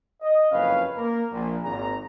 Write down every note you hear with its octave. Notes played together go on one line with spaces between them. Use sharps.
D#5
F#1 F2 C#4 B4 F5
A#3 A#4
A#1 A#2
G#1 A#2 A#5